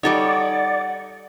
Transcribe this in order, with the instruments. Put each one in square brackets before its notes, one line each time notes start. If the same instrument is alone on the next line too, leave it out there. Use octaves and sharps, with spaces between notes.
[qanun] G3 A4 C#5 [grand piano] D#4 [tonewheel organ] D5 [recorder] F#5